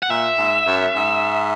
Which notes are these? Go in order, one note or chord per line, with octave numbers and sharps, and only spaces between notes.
F#5
A#2 E5
G#2
F#2
G#2